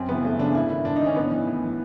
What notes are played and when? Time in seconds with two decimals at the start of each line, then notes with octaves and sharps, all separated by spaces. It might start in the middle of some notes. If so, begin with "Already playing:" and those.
Already playing: F#2 C4
0.09 C#3 E3 B3
0.24 F#2 A3
0.39 C#3 E3 D4
0.55 G#2 E4
0.70 D#3 E4
0.85 G#2 D4
0.96 D#4
1.01 D#3
1.07 C#4
1.16 A2 B3
1.31 E3
1.47 A2
1.63 E3